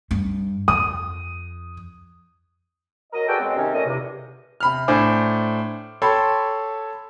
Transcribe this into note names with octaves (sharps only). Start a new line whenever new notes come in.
G2
F2 D#6
F#3 A#4 D#5
F#4 G#4 A4 B4 D5 G5
F#2 G#3 C4
C3 D#3 C4 C#4
A#2 D#3 A3 C#4 D#5
E2 G2 C3
C3 B5 F6
A2 D4 C5 G#5 D6
A4 C#5 G5 A5 B5 C6